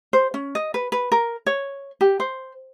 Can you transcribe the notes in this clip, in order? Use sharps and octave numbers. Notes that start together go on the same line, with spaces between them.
C5
C#4
D#5
B4
B4
A#4
C#5
G4
C5